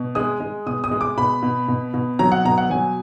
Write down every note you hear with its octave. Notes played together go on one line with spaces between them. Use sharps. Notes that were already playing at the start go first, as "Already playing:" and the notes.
Already playing: B2
G#3 D#6
G#3
B2 D#6
D#6
G#3
D6
B2 B5
B2
B2
B2
F#3 A#5
F#5
B2 A#5
F#5
F#3 G#5